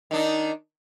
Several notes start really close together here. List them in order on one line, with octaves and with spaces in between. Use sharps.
D#3 D4 D#4